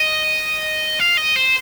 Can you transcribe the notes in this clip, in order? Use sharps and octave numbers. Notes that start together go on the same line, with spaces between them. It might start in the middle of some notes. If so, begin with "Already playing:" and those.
Already playing: D#5
F5
D#5
C5